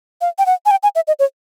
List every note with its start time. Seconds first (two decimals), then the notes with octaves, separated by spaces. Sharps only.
0.21 F5
0.38 G5
0.46 F#5
0.66 G#5
0.71 G5
0.83 G#5
0.95 E5
1.07 D#5
1.19 C#5